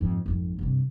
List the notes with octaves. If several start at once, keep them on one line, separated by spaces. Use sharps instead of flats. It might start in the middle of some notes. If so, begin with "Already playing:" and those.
F2 G#2
G#1 F2
G2 C3